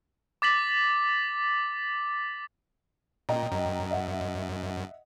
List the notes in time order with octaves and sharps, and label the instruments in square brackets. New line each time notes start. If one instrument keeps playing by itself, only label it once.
[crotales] D6 A6 B6 F#7
[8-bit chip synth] A#2 [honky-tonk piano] D#5 G5 A#5
[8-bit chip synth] F#2
[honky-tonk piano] D#5 E5 F#5